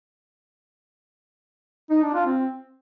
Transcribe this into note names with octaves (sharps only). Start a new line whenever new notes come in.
D#4
D4
F4
C4